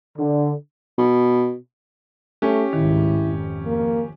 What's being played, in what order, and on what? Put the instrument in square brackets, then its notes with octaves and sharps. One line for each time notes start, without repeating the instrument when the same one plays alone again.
[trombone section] D3
[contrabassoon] B2
[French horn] A3 [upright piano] C#4 G4
[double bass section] G#1 C#2 A2 [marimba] D#3 [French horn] E4
[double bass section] F2
[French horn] A#3